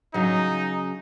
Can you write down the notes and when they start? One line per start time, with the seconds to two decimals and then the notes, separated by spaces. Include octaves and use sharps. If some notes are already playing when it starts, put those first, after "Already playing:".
0.14 C#3 F#3 D#4